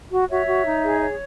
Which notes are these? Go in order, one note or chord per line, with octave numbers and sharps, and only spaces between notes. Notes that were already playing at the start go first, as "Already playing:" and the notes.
F#4
F#4 C#5 E5
F#4
D#4
G#4
C#5